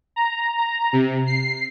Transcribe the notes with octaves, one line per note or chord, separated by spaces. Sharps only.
A#5
A#5
C3
C7